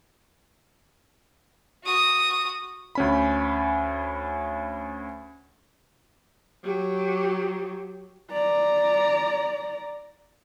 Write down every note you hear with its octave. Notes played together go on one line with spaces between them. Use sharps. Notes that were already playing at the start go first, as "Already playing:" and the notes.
F#4 D#6
D2 C#4 B5
F#3 G4
D5 A#5